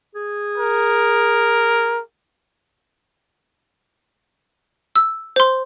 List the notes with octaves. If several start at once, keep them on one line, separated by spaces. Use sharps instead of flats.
G#4
A#4
E6
C5 C6